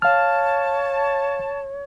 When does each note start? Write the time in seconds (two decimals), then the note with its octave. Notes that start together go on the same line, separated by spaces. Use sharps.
0.02 C#5 F5 A5 F6